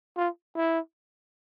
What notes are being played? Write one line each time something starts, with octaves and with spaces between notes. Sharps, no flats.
F4
E4